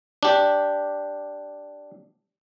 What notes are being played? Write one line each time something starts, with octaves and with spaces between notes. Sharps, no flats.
D4 G4